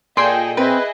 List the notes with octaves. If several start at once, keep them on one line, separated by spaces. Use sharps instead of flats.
A#2 G#4 A4 D#5 G5 C6 G#6
C4 E4 G#4 B4 D#5